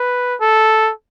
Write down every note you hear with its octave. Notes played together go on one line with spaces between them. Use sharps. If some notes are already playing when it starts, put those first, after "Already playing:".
Already playing: B4
A4